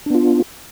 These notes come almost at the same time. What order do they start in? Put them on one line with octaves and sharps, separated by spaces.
D4 B3 F4